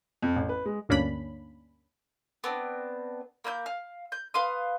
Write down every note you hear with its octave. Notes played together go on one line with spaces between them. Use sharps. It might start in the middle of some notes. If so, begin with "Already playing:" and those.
F2
A1
B4
G#3
D2 G2 A#3 C#4 D4 B5
B3 C4 D4
A#3 E4 G#5 G6
F5
G6
B4 F5 C6 D#6